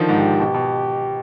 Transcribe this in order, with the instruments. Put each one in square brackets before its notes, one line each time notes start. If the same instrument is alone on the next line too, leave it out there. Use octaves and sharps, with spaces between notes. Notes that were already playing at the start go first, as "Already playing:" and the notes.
Already playing: [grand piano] D3 D#3 F3
[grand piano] G#2 [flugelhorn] G4
[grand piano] B2
B2